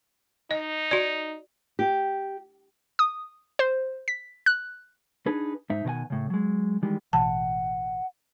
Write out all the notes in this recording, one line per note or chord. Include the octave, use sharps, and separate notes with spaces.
D#4 D#5
F#4 D5
G4
D#6
C5
B6
F#6
D4 D#4 G#4 B4
G#2 D#4 E5
B2 D#3 A#4 F#5 G#5
A2 C#3
F#3 G#3
D#3 E3 G3 G#3
A1 B2 E3 F#5 A5